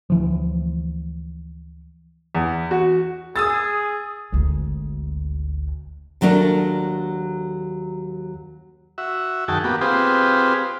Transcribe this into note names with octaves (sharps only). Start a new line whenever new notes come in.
D2 E3 F3
E2
F#4
G#4 D#6 E6 A6
G#1 D2
D#2 F#3 A3 D4 A#4
F#4 E5
F#2 D#3 F#4 G#4 G5 A5
A#3 B3 F#4 G4
C4 F4 G4 G#4 B4 C5